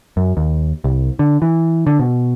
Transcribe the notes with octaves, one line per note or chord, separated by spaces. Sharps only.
F#2
D#2
C2
D3
E3
D3
B2